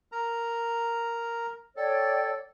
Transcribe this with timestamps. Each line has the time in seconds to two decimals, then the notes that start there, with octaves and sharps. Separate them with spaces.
0.12 A#4 A#5
1.76 A4 C#5 D5 G5